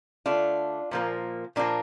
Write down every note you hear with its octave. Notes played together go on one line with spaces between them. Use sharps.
D3 A3 D4 F4
A#2 F3 A#3
A#2 F3 A#3 D4